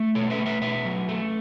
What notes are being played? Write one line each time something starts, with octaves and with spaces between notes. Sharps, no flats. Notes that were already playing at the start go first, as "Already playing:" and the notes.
Already playing: A3
B2 A4 C#5
B4 E5
A3
B4 E5
B2 B4 E5
F#3
A3